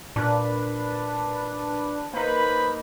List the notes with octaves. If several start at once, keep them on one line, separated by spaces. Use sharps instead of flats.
A#2 D4 B4
A#3 D#4 B4 C5 B5